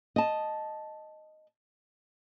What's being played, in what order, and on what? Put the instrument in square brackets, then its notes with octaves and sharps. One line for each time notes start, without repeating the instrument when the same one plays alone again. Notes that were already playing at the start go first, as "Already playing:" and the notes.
[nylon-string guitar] D#5 A5